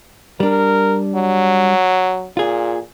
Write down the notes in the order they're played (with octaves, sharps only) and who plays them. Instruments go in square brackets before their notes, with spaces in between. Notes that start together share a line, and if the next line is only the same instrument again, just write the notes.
[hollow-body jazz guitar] G3 D4 [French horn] A#4
[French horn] F#3
[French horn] A#2 [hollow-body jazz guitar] F4 G#4